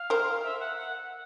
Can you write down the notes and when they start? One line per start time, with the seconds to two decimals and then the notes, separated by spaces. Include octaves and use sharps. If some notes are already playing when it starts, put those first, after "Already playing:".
Already playing: F5
0.10 A#4 C5
0.43 E5
0.60 F#5
0.77 F#5